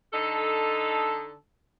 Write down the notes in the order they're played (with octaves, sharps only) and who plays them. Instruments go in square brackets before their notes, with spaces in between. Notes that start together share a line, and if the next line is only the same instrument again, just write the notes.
[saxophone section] D3 D#4 A4